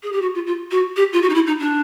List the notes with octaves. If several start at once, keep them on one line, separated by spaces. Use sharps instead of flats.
G#4
G4
F#4
F4
F4
F#4
G4
F4
F#4
D#4
E4
D#4
D4